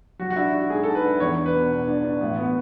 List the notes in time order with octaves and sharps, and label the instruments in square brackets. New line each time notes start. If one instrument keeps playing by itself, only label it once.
[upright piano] F#3 [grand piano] F#4
[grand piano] F#4
[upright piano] D4 [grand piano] E4
[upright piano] D4 [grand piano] F#4
[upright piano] G#2 [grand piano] G#4
[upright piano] G#2 [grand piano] A4
[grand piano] B4
[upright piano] D4
[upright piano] E2 [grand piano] C#5
[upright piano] D4
[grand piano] B4
[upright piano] B2
B2
D4
D4
A1
B3